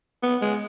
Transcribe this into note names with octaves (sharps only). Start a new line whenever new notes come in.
B3
G#3